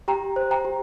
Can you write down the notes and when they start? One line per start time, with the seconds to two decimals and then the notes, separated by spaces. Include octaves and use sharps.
0.08 G4 G5 A#5
0.36 C5
0.51 G5 A#5
0.65 G4